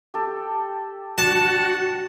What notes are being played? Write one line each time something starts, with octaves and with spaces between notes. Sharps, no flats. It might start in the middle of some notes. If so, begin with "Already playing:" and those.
G4 A4
D4 F#4 G5 A5